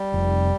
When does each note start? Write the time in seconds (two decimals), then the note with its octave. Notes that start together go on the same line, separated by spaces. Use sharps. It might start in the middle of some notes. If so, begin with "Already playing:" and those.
Already playing: G3
0.14 F1